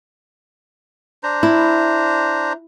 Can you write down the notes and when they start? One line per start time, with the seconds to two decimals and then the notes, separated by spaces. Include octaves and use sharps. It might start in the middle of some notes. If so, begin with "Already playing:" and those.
1.23 D4 C5 A#5
1.43 E4